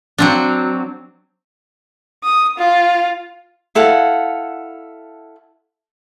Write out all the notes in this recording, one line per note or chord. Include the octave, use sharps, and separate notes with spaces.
F#3 C4 D4
D#6
F4
E4 A4 F5 F#5